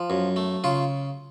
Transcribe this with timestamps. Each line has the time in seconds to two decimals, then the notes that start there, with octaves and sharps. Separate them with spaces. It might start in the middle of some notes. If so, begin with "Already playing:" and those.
Already playing: F3
0.10 F#2
0.36 A3
0.64 C#3 F4